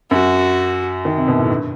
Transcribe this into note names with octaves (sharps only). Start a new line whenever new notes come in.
F#2 F#4
D#3
C3
B2
A2
G2